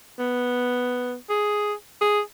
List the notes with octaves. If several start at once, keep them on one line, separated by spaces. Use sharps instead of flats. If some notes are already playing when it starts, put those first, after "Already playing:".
B3
G#4
G#4